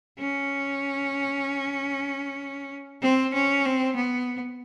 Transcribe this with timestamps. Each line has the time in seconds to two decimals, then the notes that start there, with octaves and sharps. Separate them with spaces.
0.19 C#4
3.02 C4
3.34 C#4
3.65 C4
3.96 B3